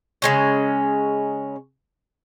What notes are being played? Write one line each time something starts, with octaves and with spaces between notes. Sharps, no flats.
C#3 G#3 C#4